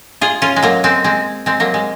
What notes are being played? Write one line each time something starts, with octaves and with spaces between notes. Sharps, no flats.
F4 G#4
C#4 F4
G#3
F#3 A#3
G#3 C4
G#3 C4
G#3 C4
F#3 A#3
G#3